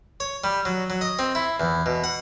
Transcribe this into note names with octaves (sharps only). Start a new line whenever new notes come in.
C#5
G3
F#3
F#3
D#5
C4
E4
E2
B2
F#5